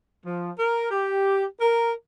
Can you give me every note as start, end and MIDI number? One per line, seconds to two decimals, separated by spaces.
0.25 0.50 53
0.57 0.85 70
0.91 1.43 67
1.60 1.93 70